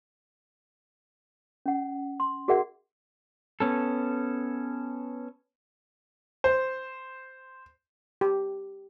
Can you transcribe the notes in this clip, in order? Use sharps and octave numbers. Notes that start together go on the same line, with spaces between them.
C#4 F#5
C6
F#4 G#4 A#4 D5 E5 F#5
B3 C#4 A4
C5
G4